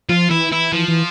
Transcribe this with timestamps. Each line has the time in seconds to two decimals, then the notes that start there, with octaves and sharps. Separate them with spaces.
0.09 F3 F4
0.30 E3 E4
0.51 E3 E4
0.72 E3 F3
0.88 E3